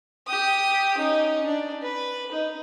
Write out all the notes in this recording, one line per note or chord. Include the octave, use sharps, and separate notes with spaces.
G4 D#6
C#4 D#4
D4
B4
D#4